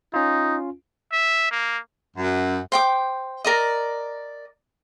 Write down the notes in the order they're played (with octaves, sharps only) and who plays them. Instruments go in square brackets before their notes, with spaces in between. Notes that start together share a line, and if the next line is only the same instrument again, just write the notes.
[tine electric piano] C#4 F4 [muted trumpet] D#4
[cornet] E5
A#3
[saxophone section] F#2
[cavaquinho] C5 G5 D6
A#4 D5 D#5